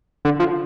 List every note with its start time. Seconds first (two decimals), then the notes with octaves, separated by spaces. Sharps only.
0.25 D3
0.40 F3